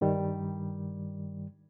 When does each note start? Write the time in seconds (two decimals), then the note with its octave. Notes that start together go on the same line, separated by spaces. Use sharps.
0.01 G2 D#3 G3